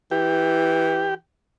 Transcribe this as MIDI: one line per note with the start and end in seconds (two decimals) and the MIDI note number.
0.11 1.15 52
0.11 1.14 67